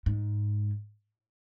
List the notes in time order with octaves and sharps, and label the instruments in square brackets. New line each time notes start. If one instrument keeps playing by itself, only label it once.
[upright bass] G#2